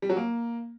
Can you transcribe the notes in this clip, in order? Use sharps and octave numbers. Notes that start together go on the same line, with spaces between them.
G3
F#3
A#3